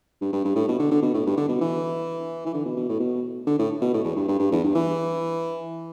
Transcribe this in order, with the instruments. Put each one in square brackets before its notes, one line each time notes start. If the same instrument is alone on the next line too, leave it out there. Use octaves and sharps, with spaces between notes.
[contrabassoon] G2
G2
G2
A2
B2
D3
D3
B2
A2
G2
D3
B2
E3
E3
D3
B2
B2
A2
B2
D3
A2
B2
A2
E2
G2
G2
G2
E2
G2
E3